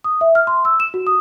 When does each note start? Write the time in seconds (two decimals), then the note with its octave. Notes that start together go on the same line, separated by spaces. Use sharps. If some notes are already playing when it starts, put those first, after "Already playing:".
0.04 D#6
0.21 E5
0.35 F6
0.47 C6
0.65 E6
0.80 E7
0.94 F#4
1.07 D#6